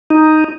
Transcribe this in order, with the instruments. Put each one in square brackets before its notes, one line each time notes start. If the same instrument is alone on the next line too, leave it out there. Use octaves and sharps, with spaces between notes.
[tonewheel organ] D#4